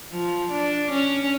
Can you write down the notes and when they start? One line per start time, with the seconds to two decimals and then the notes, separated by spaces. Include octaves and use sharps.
0.11 F3
0.51 D4
0.91 C#4